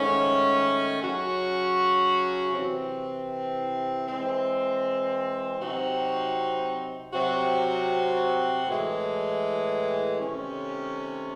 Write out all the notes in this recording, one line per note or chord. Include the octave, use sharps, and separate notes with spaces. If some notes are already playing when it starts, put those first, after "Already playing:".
Already playing: G#2 D#3 A3 C#4
C#3 F#3 C#4 F#4
C3 E3 C4
E3 G#3 C4
C3 F#3 C4 D#4 F#4
C3 F#3 C4 F#4
A2 E3 G#3
C3 D#3 A3 C#4